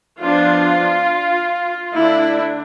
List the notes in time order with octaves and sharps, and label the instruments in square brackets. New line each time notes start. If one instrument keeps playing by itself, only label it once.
[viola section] F3 B3 D4 F4
D3 A3 D4 E4